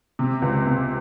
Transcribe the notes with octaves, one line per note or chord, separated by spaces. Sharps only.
C3
C#2
C3